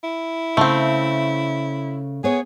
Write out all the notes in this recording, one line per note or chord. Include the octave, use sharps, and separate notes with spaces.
E4
C#3 A3 C4
B3 G#4 C#5